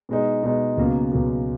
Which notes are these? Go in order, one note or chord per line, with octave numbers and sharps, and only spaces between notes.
B2 G#3 D#4
B2 G#3 D#4
C#2 B2 F#3 A#3
C#2 B2 F#3 A#3